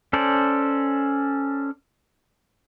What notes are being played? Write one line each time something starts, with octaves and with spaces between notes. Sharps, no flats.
C#4 A4 C5 D5